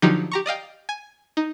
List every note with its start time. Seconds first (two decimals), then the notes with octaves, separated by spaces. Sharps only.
0.02 D3 F3 F#3 D#4 G4
0.32 G4 A#5 C#6
0.46 D5 D#5 F5 G5
0.89 G#5
1.37 D#4